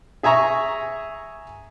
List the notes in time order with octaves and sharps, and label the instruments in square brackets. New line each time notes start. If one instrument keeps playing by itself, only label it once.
[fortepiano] G#4 E5 G#5 A#5 C#6